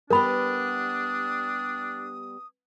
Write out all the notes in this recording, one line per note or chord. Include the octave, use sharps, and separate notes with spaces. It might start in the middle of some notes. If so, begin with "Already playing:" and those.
G3 B3 D4 G4 A#4 B5 D#6